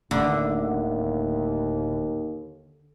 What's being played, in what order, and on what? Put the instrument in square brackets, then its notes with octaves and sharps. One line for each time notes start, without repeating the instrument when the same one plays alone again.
[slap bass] D1 A3 D4 [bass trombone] D#2 [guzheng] D3